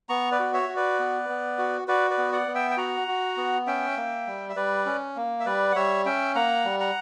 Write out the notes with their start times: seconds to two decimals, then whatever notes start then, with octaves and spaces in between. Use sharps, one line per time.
0.09 B3 A#5 C#6
0.32 B4 D5
0.39 F#4
0.54 C#5 E5
0.69 F#4
0.76 B4 D5
0.99 B3
1.29 B3
1.58 F#4
1.88 F#4 B4 D5
2.10 B4 D5
2.18 B3
2.32 D5 F#5
2.47 B3
2.55 E5 G5
2.71 G5
2.77 F#4 F#5 A#5
3.08 F#4
3.37 B3
3.67 C#4 E5 G5
3.97 A#3
4.27 G3
4.49 E5
4.56 G3 B4 D5
4.86 C#4
5.16 A#3
5.40 E5
5.46 G3 B4 D5
5.72 F#5
5.76 G3 C#5 E5
6.05 C#4 E5 G5
6.35 A#3 F#5 A#5
6.65 G3
6.80 F#5 A#5